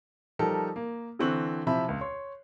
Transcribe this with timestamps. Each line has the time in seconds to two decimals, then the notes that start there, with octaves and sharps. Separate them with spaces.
0.39 F3 G3 D#4 G4 A4 A#4
0.76 A#3
1.19 D3 E3 C4 C#6 F#6 F#7
1.66 C3 F3 E4 E5 B5
1.89 C#2
2.01 C#5 C6